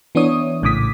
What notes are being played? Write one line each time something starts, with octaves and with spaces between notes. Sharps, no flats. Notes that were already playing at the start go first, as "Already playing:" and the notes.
E3 B3 D4 E4 C#5 D#6
A#1 A2 C#3 D6 D#6 B6